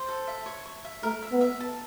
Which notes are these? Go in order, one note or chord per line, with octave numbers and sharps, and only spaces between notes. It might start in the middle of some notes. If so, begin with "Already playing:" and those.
Already playing: C5
A4
E5
C#5
C#5
E5
A3 A#4
E5
B3
E5
A5